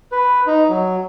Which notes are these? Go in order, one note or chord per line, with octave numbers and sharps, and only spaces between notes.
B4
D#4
F#3